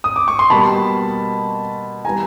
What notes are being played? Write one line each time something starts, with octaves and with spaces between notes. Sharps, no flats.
D#6
D6
C#6
C6
B2 G3 A#3 A5 B5
E3 G3 B3 G#5 A#5